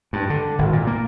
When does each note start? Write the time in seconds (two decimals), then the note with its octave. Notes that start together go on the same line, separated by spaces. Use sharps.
0.13 G2
0.30 D3
0.59 G#1
0.73 A#2
0.87 A#3